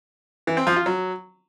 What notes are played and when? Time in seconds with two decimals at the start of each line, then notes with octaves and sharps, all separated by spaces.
0.47 E3
0.57 C4
0.67 F3
0.76 F4
0.86 F#3